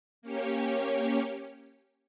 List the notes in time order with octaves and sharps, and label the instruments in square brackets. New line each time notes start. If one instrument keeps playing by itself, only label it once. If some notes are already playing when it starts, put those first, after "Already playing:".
[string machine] A#3 C#4 G4 C#5